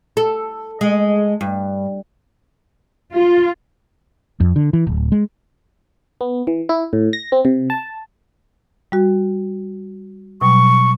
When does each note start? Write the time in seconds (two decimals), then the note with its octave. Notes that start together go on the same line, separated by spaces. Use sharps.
0.17 A4
0.81 G#3
1.41 G2
3.14 F4
4.40 F2
4.56 D3
4.73 E3
4.87 D1
5.12 G#3
6.21 B3
6.47 E3
6.69 E4
6.93 A2
7.13 A#6
7.32 C4
7.45 C3
7.70 A5
8.92 G3 F#4
10.41 B2 F#3 G3 C#6